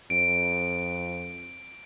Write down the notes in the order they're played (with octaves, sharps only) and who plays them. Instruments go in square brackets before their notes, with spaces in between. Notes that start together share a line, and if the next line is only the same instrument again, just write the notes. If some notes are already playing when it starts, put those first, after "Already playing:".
[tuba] F2 [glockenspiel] D7